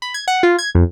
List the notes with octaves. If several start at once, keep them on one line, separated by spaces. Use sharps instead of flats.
B5
G#6
F#5
F4
G#6
F2